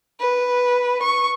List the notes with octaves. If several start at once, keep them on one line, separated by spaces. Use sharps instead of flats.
B4
C#6